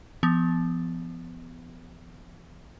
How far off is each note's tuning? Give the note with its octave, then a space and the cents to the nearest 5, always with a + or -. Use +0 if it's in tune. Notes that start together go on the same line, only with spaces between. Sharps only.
F3 -35 B3 +15